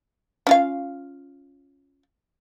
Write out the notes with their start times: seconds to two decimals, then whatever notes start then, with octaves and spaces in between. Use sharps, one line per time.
0.47 C#4 F4 F5